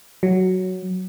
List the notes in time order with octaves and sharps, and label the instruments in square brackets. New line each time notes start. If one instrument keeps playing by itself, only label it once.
[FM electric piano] F#3